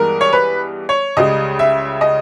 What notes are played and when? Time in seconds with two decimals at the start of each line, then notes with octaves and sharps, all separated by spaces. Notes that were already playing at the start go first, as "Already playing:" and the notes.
Already playing: G2 E3 G#3 B3 A#4
0.21 C#5
0.33 B4
0.89 C#5
1.17 C#2 C#3 G3 D#5
1.59 E5
2.01 D#5